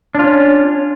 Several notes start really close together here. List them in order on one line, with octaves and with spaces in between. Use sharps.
D4 F4 C#4